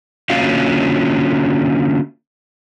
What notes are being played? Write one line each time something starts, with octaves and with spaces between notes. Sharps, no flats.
D3 A#3 C#4 F4 F#4 F5